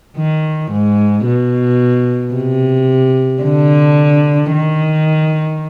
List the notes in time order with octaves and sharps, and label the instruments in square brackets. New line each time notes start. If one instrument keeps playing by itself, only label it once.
[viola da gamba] D#3
G#2
B2
C3
D3
D#3